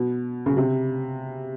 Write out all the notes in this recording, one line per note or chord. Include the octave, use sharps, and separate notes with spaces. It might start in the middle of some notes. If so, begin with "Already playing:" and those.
Already playing: B2
C#3
C3